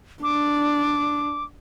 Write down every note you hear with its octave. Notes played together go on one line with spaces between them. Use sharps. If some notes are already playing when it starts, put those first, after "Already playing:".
D4 D6